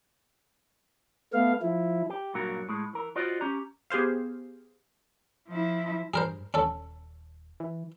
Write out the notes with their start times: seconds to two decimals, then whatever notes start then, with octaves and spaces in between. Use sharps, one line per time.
1.33 A3 B3 F5
1.62 F3 E4
2.09 G4
2.34 G2 A#2 F#3 F#4 A#4
2.69 A2 G#3
2.93 E3 A#4
3.16 F4 F#4 C5 D5 D#5
3.41 C#4 G4 A#5
3.90 B3 G4 G#4 C5 F5
5.48 F3 E4
6.14 G2 G#4 A#4 C5
6.54 D#1 C#4 A4
7.60 E3